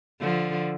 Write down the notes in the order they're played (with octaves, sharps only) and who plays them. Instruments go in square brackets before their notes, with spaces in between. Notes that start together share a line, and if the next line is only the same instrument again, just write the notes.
[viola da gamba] D3 F3